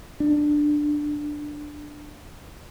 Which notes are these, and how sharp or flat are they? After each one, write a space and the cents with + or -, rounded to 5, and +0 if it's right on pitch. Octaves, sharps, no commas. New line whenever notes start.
D4 +10